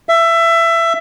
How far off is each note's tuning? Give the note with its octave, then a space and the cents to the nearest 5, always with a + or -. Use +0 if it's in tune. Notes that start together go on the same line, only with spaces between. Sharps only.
E5 +20